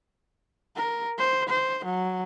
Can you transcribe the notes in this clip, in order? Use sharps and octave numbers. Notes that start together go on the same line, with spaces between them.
A#4
C5
C5
F#3